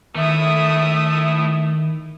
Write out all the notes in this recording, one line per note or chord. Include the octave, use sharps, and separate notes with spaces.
D#3 A3 E4 E5 D#6